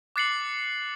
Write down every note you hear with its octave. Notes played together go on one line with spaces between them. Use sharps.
D6 F#6 A6 C7 C#7 F#7